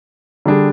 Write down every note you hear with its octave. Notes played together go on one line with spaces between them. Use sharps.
D3 G3 D4 G#4